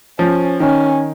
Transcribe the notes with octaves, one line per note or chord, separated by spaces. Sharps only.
F3 C#4
D#3 C#4